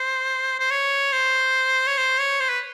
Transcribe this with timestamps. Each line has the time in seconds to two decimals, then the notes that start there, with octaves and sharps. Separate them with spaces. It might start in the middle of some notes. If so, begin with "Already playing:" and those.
Already playing: C5
0.59 C5
0.71 C#5
1.12 C5
1.87 C#5
1.97 C5
2.19 C#5
2.40 C5
2.50 B4